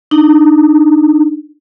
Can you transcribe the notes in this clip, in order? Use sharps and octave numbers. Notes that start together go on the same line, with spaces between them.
D4 D#4